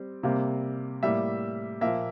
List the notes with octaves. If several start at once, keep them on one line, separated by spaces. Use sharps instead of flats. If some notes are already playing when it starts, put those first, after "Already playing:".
Already playing: G3 C4
C3 G3 A#3
A2 G3 A#3 E5
A#2 F3 A#3 E5